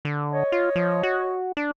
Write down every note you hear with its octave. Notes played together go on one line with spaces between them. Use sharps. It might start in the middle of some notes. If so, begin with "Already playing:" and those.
D3
C#5 D#5
F4
F3
F#4
D4